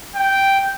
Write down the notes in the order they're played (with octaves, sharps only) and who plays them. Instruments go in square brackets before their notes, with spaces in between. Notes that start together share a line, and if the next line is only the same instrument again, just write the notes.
[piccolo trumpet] G5